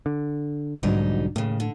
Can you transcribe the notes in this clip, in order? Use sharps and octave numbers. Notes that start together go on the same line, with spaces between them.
D3
B1 G#2 D3 F#3 G3 D#4
D#2 A2 C#3
D3